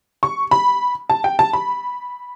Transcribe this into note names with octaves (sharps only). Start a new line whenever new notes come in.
C#6
B5
A5
G5
A5
B5